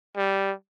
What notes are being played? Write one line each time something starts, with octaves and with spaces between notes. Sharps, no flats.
G3